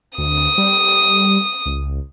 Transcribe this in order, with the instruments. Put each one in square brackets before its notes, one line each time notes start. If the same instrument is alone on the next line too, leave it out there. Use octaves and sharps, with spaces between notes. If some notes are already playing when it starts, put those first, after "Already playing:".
[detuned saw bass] D2 [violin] D#6
[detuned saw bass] G3
C#2